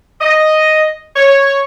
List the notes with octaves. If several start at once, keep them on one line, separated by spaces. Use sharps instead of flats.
D#5
C#5